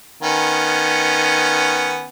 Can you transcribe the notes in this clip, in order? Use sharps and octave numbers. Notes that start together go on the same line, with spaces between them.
D#3 B3 C#4